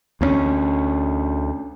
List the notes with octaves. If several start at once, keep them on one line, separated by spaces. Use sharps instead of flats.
D2 B3 C#4